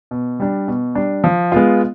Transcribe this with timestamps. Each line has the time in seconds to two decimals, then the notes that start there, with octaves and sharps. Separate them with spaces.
0.11 B2
0.40 G3 D4
0.68 B2
0.95 G3 D4
1.24 F3
1.52 G#3 B3 F4